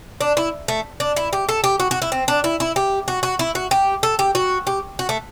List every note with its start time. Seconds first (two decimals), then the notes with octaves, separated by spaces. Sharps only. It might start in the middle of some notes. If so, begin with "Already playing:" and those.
0.21 D4
0.37 E4
0.68 A3
1.00 D4
1.17 E4
1.33 G4
1.49 A4
1.64 G4
1.80 F#4
1.91 F#4
2.02 E4
2.12 C4
2.28 D4
2.44 E4
2.60 E4
2.76 G4
3.08 F#4
3.23 F#4
3.39 E4
3.55 F#4
3.71 G4
4.03 A4
4.19 G4
4.35 F#4
4.67 G4
4.99 F#4
5.09 A3